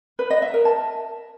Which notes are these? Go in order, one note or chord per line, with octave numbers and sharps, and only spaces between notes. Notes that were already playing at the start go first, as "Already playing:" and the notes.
B4
D#5
E5
A#4
A5